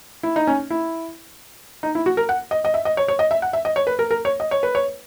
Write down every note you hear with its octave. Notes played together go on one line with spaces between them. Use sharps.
E4
D#4
C#4
E4
D#4
E4
F#4
A#4
F#5
D#5
D#5
E5
D#5
C#5
C#5
D#5
E5
F#5
E5
D#5
C#5
B4
A#4
A#4
C#5
D#5
C#5
B4
C#5